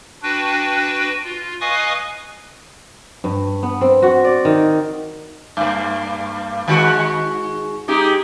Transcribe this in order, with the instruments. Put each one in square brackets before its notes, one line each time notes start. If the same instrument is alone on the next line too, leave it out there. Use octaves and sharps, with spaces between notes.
[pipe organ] D4 F#4 B4 G5
F4
B4 D#5 F5 G#5 C#6 D#6
[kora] G2
B3
C4
F#4
D5
D#3
[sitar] G2 A#3
D#3 G#3 F#4
G#3 D#4 G4